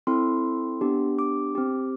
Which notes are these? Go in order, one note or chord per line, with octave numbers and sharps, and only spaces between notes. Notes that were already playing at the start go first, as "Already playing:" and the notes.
C4 E4 A4 C6
B3 D4 G4
D6
C4 G4